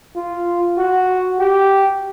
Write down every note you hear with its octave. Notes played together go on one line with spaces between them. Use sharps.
F4
F#4
G4